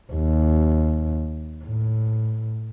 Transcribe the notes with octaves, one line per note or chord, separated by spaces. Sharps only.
D#2
A2